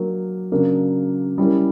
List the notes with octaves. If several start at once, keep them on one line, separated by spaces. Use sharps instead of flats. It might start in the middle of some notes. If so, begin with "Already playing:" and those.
Already playing: F#3 A#3 D4 A#4
C#3 F#3 A#3 D4
G3 C#4 E4 A#4